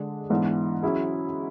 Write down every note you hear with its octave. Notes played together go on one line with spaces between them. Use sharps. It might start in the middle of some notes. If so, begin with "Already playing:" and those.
Already playing: D3 G#3 D4
G#2 E3 B3 D4
F#3 C#4 E4 G#4